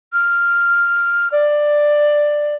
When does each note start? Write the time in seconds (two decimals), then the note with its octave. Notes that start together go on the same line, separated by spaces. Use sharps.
0.13 F6
1.32 D5